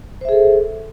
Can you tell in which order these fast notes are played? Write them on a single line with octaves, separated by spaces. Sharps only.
C5 E5 G#4 A4